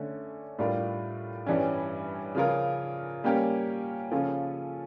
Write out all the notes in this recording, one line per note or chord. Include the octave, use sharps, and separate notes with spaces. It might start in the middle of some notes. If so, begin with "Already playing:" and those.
Already playing: D3 A3 C#4
A2 G3 D4 F4 A#4
G2 E3 G3 C#4
C#3 F3 C#4 F4 A#4
G3 A#3 C#4 G4 A#4
C#3 F3 C#4 F4 A4